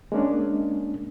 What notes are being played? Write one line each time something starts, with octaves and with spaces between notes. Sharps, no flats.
G#3 A#3 C#4 D4